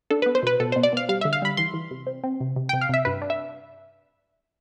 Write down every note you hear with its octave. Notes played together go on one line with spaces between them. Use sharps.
D4 A4
B4
B3
C5
B2 B4
B2 A4
C5
B2
D5
B2 F5
G3 F5
D3 E5
F5
G3 B5
E3 C6
E3
C3
C4
C4
C3
C3
G5
C3
F5
C3 E5
G2 B4
D4
E5